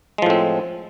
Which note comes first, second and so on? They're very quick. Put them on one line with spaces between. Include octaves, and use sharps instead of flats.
G#3 F3 A2 C4